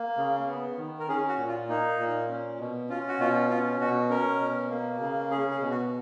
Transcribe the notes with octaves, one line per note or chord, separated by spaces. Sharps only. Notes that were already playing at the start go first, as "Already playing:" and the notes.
Already playing: A#3
C#3
B3
D#3
A#4
C#4 G#4
F#4
A#2
F4
A#3 D#4
A#2
C#4
B2
C#4 F4
F#4
B2 F4
C#4 F4
B2 F#4
C#4 A#4
B2
A#3
C#3
C#4 G#4
G#4
B2
F#4